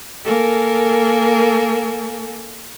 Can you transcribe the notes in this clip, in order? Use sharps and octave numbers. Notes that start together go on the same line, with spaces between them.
A#3 A4 A#4 G#5